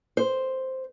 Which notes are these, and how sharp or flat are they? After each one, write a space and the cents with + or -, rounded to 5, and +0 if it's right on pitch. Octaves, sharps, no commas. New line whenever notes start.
C5 +0